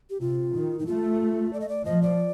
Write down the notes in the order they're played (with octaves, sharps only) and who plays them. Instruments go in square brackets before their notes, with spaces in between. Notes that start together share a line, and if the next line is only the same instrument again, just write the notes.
[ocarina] G4
[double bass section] C3 [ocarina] F4
[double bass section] D#3
[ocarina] D#4
[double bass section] A3 [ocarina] F4
[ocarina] D5
D#5
D5
[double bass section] F3 [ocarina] D#5
[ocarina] D5